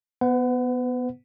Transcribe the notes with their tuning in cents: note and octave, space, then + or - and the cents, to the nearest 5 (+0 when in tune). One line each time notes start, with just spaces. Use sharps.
B3 +0 B4 +40 F#5 +0